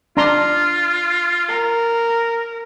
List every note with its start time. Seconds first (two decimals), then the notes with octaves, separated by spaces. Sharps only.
0.17 D4 F4 A#5 C6
1.48 A#4